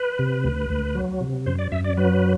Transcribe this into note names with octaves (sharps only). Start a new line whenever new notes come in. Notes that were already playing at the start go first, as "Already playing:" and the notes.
Already playing: B4
C3
D2
D2
F#3
C3
F#2 C5
D5
F#2 E5
D5
F#3 B4